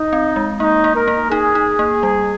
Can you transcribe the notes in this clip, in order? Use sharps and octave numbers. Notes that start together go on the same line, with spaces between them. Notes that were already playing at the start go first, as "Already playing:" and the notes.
Already playing: D#4
C4
G#3
A#3 D#4
A#3
A#4
A#3
D#4 G#4
D#4
A#3
G3